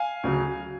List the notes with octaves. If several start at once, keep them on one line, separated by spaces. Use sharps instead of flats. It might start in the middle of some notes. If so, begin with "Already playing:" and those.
Already playing: F5 G#5
D2 C#3 F#3